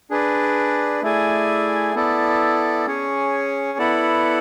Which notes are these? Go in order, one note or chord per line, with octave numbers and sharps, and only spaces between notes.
D4 G#4 B4 D5
A3 E4 G#4 D5 G#5
B3 E4 A4 D5
C#4 G#4 C#5
B3 E4 A4 D5 F#5